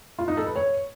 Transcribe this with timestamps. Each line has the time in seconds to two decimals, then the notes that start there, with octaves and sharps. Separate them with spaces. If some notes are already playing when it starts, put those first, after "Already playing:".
0.19 F4
0.28 D#4
0.37 A4
0.46 B4
0.56 C#5